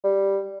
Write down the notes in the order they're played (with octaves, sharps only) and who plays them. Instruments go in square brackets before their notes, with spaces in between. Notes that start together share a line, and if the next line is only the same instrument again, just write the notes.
[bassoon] G3